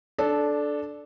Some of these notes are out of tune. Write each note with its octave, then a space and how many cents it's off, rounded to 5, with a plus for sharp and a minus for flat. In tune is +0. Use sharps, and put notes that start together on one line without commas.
D4 +0 A4 -15